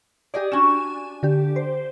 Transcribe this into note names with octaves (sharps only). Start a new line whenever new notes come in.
G4 G#4 D5 D#5 G#5
C#4 D4 F#4 G#5 E7
D3 G4
C5